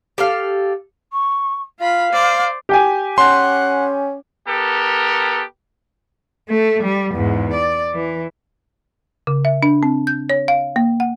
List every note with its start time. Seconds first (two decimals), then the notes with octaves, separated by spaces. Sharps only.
0.18 G4 A4 F5
1.12 C#6
1.80 F4 F5 B5
2.12 C5 D5
2.69 G4 G5 G#5
3.18 C#4 F#5 C6
4.48 B3 G4 A4 A#4
6.49 A3
6.83 G3
7.13 E2 G#2
7.53 D5
7.94 E3
9.27 C#3
9.45 E5
9.63 D4
9.83 C4
10.07 G6
10.30 C#5
10.48 F5
10.76 A#3
11.00 F#5